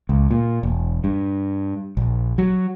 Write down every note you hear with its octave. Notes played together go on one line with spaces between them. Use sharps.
C#2
A#2
E1
G2
A#1
F#3